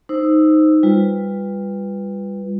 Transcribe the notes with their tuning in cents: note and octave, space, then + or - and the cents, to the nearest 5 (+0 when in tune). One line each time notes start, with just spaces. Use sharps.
D#4 +0 C5 +0 E6 +0
G3 +25 F4 +0 B4 +0